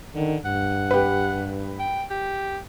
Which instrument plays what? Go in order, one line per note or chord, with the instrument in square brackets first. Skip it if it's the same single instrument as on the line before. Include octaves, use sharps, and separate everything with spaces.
[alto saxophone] D3 [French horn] D#3
[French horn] G2 [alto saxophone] F#5
[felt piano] G4 B4
[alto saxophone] G5
G4